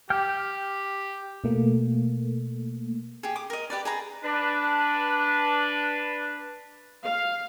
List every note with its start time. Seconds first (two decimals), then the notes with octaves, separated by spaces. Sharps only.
0.10 G4 G5 F6 G6
1.44 B2 A3 A#3
3.23 G4 G#4
3.36 D6 D#6
3.50 A#4 D#5
3.70 G4 B4 D5
3.85 G#4 B4 A#5 B5
4.23 D4 B4
7.05 F5